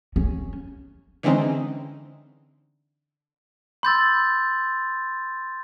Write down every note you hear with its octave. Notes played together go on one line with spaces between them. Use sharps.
C#4
D3 E3 G#3 C4 C#4 D#4
B5 C6 D6 E6 G6 A6